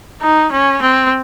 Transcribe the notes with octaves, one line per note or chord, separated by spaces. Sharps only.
D#4
C#4
C4